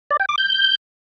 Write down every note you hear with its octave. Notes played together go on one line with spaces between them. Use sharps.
D5
G5
D6
G6